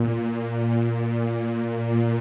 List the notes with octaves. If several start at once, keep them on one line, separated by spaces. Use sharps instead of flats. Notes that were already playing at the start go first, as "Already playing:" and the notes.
Already playing: A#2
A#2
A#2